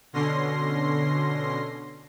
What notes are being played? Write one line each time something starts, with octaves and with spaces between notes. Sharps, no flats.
B2 D3 C#4 C6 A#6 C7